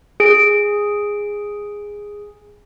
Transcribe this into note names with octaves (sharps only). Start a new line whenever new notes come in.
G#4 D7